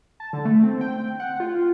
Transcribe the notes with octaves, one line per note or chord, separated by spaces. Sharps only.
A5
D3
A3
C4
G5
F#5
F4